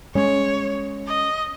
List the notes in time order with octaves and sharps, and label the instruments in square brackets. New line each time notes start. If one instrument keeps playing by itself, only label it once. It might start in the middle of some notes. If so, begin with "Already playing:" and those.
[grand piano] G#3 [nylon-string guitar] C#4 [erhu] C#5
[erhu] D#5